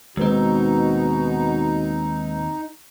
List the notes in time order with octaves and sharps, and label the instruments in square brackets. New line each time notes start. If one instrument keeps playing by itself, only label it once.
[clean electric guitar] D#2 C4 [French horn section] B2 F#4 [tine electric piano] G#3 B4 [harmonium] D#4